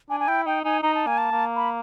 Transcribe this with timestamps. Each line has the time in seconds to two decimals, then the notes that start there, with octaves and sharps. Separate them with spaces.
0.10 D4 G#5
0.20 G#5
0.28 E4 G5
0.46 D#4 G5
0.65 D#4 G#5
0.83 D#4 A#5
0.95 A5
1.07 A#3 G#5
1.18 A5
1.32 A#3
1.56 B5